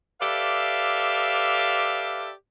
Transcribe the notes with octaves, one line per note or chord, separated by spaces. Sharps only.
G4 A4 B4 D5 E5 F5